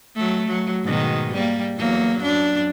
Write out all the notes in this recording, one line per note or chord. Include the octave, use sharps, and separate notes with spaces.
F#3 A3
F#3
G#2 B2 D#3
G3 A#3
E2 F#3 A#3
F#2 D4